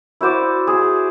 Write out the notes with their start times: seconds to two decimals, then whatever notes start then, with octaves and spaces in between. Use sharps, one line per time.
0.21 E4 F#4 C5 D5
0.67 G#4